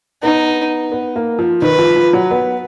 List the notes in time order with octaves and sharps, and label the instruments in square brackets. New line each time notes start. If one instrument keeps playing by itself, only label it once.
[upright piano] B3 [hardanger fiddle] D#4
[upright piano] B3
A#3
F3
[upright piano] D#3 [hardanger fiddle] B4
[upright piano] F3
F3
F#3
B3